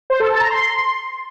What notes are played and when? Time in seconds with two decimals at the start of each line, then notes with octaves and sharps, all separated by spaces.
0.10 C5
0.20 A4
0.30 A5
0.40 A#5
0.50 C6